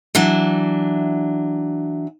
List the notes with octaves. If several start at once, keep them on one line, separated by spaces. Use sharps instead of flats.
E3 F#3 D4